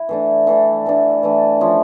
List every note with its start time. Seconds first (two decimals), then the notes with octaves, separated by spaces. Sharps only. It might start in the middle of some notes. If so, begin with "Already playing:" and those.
Already playing: E4
0.09 E3 A3 D4
0.47 E3 A3 D4
0.86 E3 A3 D4
1.23 E3 A3 D4
1.60 F3 C#4 E4